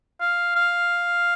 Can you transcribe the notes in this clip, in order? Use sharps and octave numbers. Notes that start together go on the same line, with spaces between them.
F5
F5